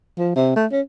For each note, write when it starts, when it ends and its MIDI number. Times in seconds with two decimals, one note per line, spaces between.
0.18 0.33 53
0.36 0.52 48
0.56 0.66 57
0.71 0.81 61